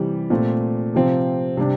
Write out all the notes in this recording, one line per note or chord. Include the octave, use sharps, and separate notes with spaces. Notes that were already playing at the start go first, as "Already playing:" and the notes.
Already playing: C3 E3 G3
A#2 A3 C4
C3 F3 C4
C3 G3 D4